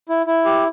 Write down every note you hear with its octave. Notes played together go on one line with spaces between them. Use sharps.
E4
E4
G4